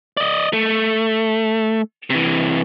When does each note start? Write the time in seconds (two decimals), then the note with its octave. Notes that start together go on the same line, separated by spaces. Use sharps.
0.17 D5 D#5
0.53 A3
2.10 C3 E3